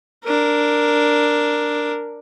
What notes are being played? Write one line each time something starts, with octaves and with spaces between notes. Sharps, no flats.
D4 A#4